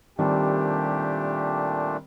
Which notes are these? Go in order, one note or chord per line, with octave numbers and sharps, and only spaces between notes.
A#2 D#3 G3 A3 C4 D4 G4